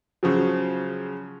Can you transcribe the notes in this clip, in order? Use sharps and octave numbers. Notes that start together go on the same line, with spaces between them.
C#3 F3 F#3